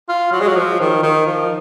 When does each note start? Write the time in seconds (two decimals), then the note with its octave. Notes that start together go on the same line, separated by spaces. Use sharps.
0.09 F4
0.32 F#3
0.40 G#3
0.47 F#3
0.56 F3
0.80 D#3
1.03 D#3
1.26 F3